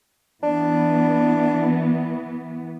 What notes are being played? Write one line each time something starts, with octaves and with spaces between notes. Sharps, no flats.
E3 B3 D4